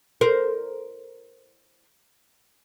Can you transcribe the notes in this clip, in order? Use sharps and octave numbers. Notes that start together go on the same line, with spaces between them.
A#4 C5